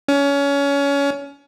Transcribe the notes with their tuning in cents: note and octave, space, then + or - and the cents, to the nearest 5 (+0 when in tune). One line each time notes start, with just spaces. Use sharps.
C#4 +25